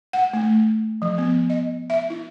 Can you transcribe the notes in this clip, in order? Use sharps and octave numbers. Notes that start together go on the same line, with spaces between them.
F#5
A3
F3
B3
D#5
E5
E4